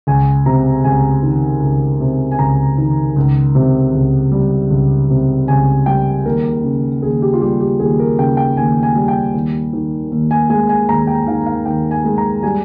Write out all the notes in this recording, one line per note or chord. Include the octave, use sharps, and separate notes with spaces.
C#2 G#5
C3 A#5
C#2 G#5
D#3
C#2
C3
G#5
C#2 A#5
D#3
C#2
C3
C#2
G3
C#2
C3
C#2 G#5
G3 G5
D#2 A#4
C#3
D#2 G#4
G4
F4
G3 G4
G4
D#2 G#4
A#4
C#3 G5
G5
D#2 G#5
G#5
G3
G5
D#2
D#3
D#2
G#5
G#3 G#5
G#5
D#2 A#5
G5
D#3 F5
F5
D#2 G5
G#5
G#3
A#5
G3 G#5